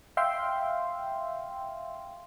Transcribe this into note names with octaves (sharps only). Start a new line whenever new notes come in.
E5 F5 G5 C6